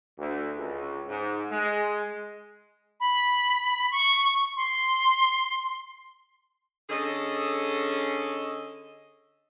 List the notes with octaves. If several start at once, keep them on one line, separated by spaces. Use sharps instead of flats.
D2
C#2
G#2
G#3
B5
C#6
C6
D3 C#4 G#4 A4 D#5